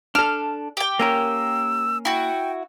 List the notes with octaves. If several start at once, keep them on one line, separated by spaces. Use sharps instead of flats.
D4 A4 F6
G4 G5
A#3 C#4 A#4 E6
E4 F#4 G5